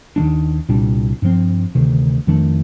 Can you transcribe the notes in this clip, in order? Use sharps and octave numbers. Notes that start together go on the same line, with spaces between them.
D#2 D#3 A3 D4
C2 A#2 G3 D4
G2 F3 C4
D2 C3 D#3
F2 D#3 A3 D4